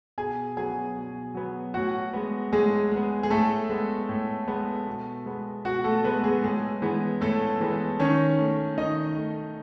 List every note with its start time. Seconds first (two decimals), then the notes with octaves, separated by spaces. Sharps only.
0.18 B2 G#4 G#5
0.57 F#3 B3 G#4 G#5
0.96 B2
1.35 F#3 B3
1.74 A2 F#4 F#5
2.13 G#3 B3
2.52 A2 G#3 G#4
2.92 G#3 B3
3.23 G#4
3.30 A2 A3 A4
3.70 G#3 B3
4.09 A2
4.48 G#3 B3
4.87 B2
5.26 G#3 B3
5.65 B2 F#4 F#5
5.84 A3 A4
6.04 G#3 B3 B4
6.24 G#3 G#4
6.43 A2 G#3 G#4
6.82 E3 G#3 B3
7.21 A2 A3 A4
7.60 E3 G#3 B3
7.99 D#3 C#4 C#5
8.38 A3
8.78 D#3 D#4 D#5
9.17 A3